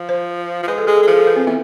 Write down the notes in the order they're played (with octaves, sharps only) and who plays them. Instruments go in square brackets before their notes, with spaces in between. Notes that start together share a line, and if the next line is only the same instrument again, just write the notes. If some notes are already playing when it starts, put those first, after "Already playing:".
Already playing: [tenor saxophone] F3
[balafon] C5
[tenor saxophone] F3
[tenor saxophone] G#3 [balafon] B4
[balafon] A4
[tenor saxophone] G#3 [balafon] G#4
[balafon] A4
[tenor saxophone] G#3
[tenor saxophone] F3 [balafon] G#4
[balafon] A4
B4
C4
[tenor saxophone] E3 [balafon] B3